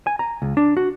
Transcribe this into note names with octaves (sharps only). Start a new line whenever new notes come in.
G#5
A#5
C#2
D4
F#4